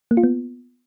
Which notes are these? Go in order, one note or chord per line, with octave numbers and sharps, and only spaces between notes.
A#3
F4
B3